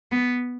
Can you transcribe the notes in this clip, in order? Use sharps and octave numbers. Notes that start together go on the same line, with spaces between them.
B3